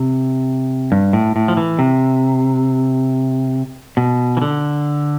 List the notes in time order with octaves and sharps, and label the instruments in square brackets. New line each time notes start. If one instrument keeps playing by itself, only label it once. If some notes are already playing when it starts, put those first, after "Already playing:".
Already playing: [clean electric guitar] C3
G2
A2
A2
F3
E3
C3
B2
E3
D3